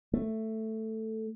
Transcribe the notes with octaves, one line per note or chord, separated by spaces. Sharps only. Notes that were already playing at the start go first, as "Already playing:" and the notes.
A3